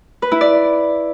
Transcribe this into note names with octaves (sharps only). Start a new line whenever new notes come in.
B4
E4
D5